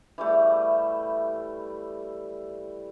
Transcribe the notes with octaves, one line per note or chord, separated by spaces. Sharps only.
E3 G3 A3